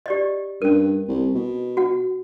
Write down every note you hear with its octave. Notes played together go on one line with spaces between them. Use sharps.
G4 D5 D#5
G2 C#4 A#4
C2
B2
F#4 F#5